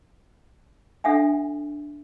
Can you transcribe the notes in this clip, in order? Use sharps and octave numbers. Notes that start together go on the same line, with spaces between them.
D4 A4 E5 F#5 G#5